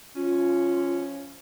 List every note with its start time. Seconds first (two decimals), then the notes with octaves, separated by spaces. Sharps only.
0.16 F3 C#4 F4